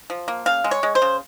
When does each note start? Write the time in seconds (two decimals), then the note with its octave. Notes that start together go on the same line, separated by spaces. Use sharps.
0.10 F3
0.28 A#3
0.46 C#3 F5
0.64 G#3
0.71 C#5
0.83 G#3
0.95 C5
1.02 C#3